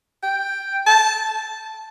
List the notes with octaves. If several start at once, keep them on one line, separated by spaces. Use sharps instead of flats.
G5
A5